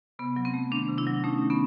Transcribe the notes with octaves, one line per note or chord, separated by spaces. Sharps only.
C3 B3
F#3
C4
A3
D#3 C4 D4
C3
D4 E4
F#3
A3 C#4 D#4
D#3
B3 C#4